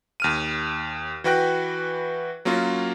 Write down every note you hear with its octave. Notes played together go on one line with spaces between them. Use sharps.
D#2 F6 D#7
E3 F#4 B4 G5 F#6 A#6
F#3 A#3 C#4 F4 A#4